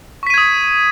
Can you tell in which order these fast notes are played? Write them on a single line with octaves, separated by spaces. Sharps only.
C#6 B6 D#7 G#6 D#6